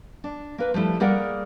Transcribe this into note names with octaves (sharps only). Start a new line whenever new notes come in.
D4
A#3 B4 F5
F3 G3 A3 E4
G3 A#3 G#4 A#4 D5 F#5